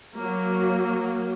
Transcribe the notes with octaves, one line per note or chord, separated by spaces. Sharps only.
F#3 A#3